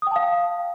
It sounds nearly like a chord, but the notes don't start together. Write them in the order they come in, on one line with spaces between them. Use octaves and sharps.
D#6 G5 A5 F5